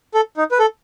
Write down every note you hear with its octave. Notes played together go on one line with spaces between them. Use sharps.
A4
D#4
B4
A4